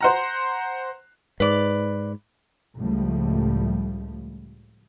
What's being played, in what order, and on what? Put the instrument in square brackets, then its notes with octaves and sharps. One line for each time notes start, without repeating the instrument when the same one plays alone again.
[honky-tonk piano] C5 F#5 A#5
[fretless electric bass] G#2 [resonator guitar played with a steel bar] B4 D5
[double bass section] C#2 A2 F3 G3 A3